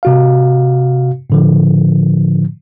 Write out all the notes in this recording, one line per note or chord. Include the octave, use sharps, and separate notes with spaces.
C3 F#4 F5
A2 D3 F3